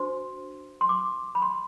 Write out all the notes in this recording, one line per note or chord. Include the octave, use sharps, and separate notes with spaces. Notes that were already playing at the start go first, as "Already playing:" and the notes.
Already playing: D4 F#4 C5 C6
C6
D6
B5
C6